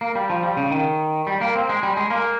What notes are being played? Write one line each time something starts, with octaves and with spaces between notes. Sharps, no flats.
A#3
G3
F3
G3
C#3
D#3
G3
A#3
C4
G#3
G3
G#3
A#3